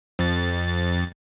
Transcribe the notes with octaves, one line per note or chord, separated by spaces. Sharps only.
F2 A6